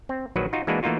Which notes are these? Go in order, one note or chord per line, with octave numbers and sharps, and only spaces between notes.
C4
A#1 D#3 F#3 F#4 B4
D#4 F4 F#4
E3 G#3 A#3 D4 F#4 B4
E3 A3 A#3 D#4 F4 F#4